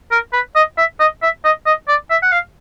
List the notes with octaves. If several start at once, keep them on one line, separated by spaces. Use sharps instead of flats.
A#4
B4
D#5
E5
D#5
E5
D#5
D#5
D5
E5
F#5
F5